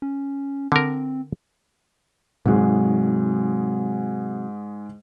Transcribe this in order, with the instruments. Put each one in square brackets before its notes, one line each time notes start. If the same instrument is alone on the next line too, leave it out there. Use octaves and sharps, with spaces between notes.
[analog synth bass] C#4
[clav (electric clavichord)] D3 A#4 [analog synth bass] C4
[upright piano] G#2 G#4 [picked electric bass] C3 F#3